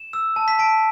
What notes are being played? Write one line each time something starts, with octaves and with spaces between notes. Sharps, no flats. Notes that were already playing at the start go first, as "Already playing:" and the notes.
Already playing: E7
E6
A5
B6
A5 D7